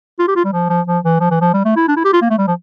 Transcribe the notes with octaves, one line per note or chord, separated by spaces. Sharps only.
F4
G4
F4
G3
F3
F3
F3
E3
F3
E3
F3
G3
A3
E4
D4
E4
G4
F4
A#3
A3
G3
F3